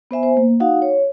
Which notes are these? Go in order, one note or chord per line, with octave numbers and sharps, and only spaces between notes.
B3 C5 E5 G#5
C5
A#3
D#4 F#4 F5 F#5
C#5